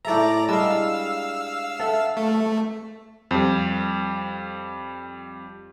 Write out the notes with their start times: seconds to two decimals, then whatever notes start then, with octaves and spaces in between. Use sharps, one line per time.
0.05 A2 A4 D5 E5 A#5
0.49 G3 G#3 D4 F5 E6
1.79 A4 E5 F#5
2.17 A3
3.31 F2 G3